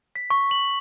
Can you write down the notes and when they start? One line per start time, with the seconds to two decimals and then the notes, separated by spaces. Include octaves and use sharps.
0.16 B6
0.30 C#6
0.51 F#7